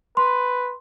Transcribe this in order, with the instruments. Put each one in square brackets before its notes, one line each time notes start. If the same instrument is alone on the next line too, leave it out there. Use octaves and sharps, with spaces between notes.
[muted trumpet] B4 [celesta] C6